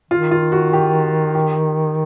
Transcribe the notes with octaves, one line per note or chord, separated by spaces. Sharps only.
D#3 F4
F4
F#4
G4
G4